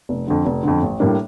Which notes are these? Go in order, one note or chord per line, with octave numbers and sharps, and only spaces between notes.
F1
F2 D3
F1
F2 D3
A1
A2 G3 A#3 D4